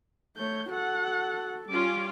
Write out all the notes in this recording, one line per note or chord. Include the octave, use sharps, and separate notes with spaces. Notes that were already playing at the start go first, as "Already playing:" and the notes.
A3 C#5 G6
F#4 A4 F#5
G3 C#4 F4 D6